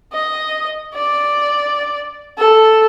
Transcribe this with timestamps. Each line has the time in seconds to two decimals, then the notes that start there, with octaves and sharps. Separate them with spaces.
0.13 D#5
0.94 D5
2.38 A4